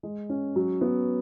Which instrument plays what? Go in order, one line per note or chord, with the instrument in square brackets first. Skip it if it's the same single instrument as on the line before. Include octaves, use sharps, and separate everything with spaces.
[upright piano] G#3
C#4
F#3
B3